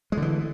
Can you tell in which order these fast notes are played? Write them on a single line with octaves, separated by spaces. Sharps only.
G#3 D3 E3